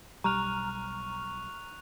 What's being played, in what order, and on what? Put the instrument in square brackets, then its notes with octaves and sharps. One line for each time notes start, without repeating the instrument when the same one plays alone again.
[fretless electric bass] B1 G3 [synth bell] A#5 F6 [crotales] C#6 F#6 F7